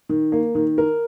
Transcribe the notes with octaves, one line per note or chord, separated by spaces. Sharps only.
D#3
A#3
D#3
A#4